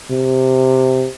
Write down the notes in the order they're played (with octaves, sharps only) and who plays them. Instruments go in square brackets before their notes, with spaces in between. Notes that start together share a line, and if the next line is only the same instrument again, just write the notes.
[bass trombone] C3